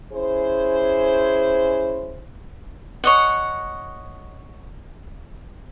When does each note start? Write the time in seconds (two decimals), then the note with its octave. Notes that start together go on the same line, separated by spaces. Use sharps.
0.13 C#4 E4 G#4 C5
3.04 C#5 D#5 F#5